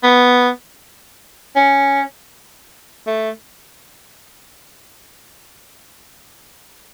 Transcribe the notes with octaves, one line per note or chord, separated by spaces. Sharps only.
B3
C#4
A3